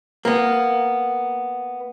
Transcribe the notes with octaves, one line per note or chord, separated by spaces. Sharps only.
A#3 B3